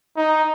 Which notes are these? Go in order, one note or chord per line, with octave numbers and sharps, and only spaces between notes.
D#4